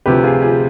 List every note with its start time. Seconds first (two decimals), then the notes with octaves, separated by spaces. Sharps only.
0.06 D2 C3 F3 G4 B4
0.24 F4 G#4
0.42 F4 G#4